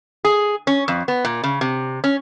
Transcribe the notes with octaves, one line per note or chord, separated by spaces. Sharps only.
G#4
C#4
F2
B3
A#2
C#3
C3
C#4